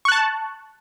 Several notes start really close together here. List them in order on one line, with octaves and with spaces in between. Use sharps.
C#6 F#6 A5